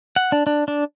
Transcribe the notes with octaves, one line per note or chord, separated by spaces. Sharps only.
F#5
D4
D4
D4